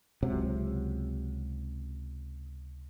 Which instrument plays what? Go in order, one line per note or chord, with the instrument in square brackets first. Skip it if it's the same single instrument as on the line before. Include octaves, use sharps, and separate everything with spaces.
[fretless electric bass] C#2 C3 F#3